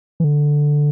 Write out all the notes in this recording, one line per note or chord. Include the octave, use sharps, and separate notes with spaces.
E3
D3